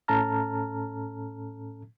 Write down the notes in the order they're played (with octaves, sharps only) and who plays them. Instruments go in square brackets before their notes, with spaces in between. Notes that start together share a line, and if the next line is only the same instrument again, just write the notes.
[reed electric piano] A2 C#4 A4 A5 A#5 F6